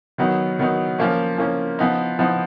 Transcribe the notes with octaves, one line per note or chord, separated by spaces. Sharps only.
D#3 F#3 B3 D#4
D#3 F#3 B3 D#4
F3 A#3 C#4
F3 A#3 C#4
F3 B3 D#4
F3 B3 D#4